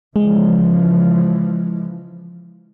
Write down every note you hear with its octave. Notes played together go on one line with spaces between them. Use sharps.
C#3 E3 F3 G#3